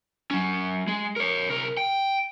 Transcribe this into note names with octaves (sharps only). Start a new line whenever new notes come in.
F#3 C#4
G#3
A#4 C#5
C3 A#4
G5